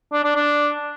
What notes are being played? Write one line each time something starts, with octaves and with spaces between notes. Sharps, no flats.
D4
D4
D4